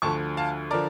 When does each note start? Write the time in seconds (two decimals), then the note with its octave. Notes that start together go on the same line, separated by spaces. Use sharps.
0.02 D2 D3 F3 A5 C#6
0.37 F5 A5
0.71 D3 F3 A#4 D5